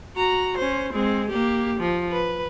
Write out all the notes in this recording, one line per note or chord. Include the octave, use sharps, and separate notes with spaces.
F#4 A#5
C#4 C5
G#3 C4
A#3 G4
F3
B4